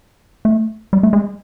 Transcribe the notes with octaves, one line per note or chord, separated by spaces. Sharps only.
A3
G3
A3
G#3